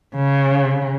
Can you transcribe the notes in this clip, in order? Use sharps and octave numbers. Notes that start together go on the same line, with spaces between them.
C#3